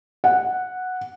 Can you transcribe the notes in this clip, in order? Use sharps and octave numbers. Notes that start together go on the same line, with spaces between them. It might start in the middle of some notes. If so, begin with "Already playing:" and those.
F#5